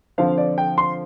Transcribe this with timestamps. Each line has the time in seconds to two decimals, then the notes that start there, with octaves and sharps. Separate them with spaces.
0.18 D3 F3 C4 F4 F5
0.38 D5
0.58 G5
0.78 C6